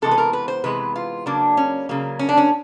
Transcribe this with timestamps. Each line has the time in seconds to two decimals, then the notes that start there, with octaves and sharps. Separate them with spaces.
0.02 C3 E3 G#3 B3 A4
0.11 B4
0.18 A#4
0.33 B4
0.48 C5
0.64 C3 E3 G#3 B3 B4
0.96 F4
1.26 C#3 F#3 A#3 D4
1.57 C#4
1.89 C#3 F#3 A#3
2.19 C#4
2.29 D4
2.37 C#4